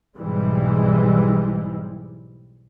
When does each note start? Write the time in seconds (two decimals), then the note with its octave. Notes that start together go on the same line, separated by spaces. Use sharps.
0.16 B1 G#2 E3 G3 G#3